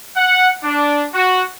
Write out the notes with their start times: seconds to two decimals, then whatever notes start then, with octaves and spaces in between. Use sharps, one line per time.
0.16 F#5
0.63 D4
1.14 F#4